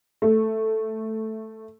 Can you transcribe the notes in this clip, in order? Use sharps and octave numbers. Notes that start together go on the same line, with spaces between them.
A3